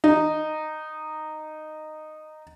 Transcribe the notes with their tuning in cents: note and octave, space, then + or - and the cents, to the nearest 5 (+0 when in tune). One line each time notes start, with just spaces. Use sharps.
D#4 -10